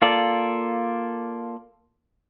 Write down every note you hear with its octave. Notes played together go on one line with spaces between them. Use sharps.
A#3 F4 A4 D5